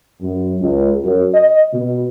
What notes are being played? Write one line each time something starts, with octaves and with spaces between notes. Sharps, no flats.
F#2
C#2
F#2
D#5
B2